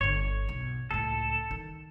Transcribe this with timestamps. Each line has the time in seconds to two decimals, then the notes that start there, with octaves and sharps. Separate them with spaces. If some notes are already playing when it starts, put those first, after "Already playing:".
0.01 G1 D3 C#5
0.49 B1
0.91 C#2 A2 A4
1.51 D#3